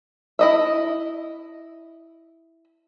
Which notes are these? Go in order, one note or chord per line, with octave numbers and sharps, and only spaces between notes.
E4 D#5 E5